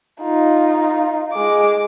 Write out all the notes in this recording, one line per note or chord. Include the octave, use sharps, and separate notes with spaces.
D#4 F4
G#3 D6